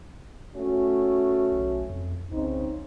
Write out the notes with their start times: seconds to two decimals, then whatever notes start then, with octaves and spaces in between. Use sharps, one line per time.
0.54 A3 C#4 F#4
1.51 B1
1.89 F2
2.31 C2 C#3 C4 D#4